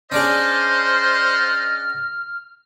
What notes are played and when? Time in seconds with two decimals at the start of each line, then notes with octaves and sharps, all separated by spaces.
0.12 C#4 D4 G#4 C5 D5 D#5 F#5 F6